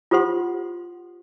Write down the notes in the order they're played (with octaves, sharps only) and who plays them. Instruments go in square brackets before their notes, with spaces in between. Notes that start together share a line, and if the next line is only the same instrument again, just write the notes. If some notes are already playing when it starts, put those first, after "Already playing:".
[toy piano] F4 G4 A4 C5 F#5 C6